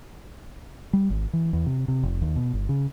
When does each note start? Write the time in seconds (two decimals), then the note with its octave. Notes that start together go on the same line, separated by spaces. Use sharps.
0.93 G3
1.10 G#1
1.33 E3
1.53 E2
1.66 C3
1.88 C3
2.03 F1
2.22 D#2
2.36 B2
2.53 G1
2.69 C#3